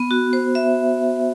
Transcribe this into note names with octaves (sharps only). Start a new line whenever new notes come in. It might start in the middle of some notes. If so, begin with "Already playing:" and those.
Already playing: B3
F#4
C5
E5